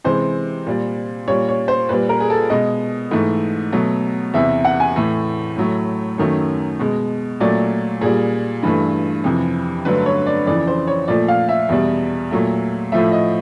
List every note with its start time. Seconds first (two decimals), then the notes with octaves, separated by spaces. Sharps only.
0.05 C3 E3 G#3 C5
0.67 A#2 G3
1.28 A#2 G3 C#5
1.48 C#5
1.68 C5
1.89 A#2 G3 B4
2.09 A#4
2.20 G#4
2.30 A4
2.50 B2 G#3 D#5
3.11 G#2 E3 A3
3.72 B2 F#3 A3
4.34 E2 C3 E3 E5
4.65 F#5
4.80 G#5
4.96 A2 E3 A3
5.57 A2 F#3 A3
6.18 F#2 D#3 F#3 A3
6.79 B2 G#3
7.40 A#2 F#3 A3 D5
8.01 A#2 G3 G#4
8.63 G2 E3 A3
9.24 F2 C3 E3
9.85 G2 D3 F#3 A3 B4
10.06 C#5
10.26 D5
10.46 F2 C#3 E3 D5
10.67 C5
10.87 C#5
11.08 A#2 F3 A3 D5
11.28 F5
11.49 E5
11.69 E2 B2 G3
12.31 A#2 F#3 A3
12.92 A2 F3 A3 E5
13.12 D#5